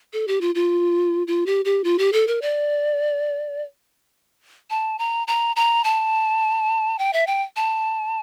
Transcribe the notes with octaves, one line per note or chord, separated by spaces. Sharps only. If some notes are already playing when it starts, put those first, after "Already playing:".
A4
G4
F4
F4
F4
G4
G4
F4
G4
A4
A#4
D5
A5
A#5
A#5
A#5
A5
G5
E5
G5
A5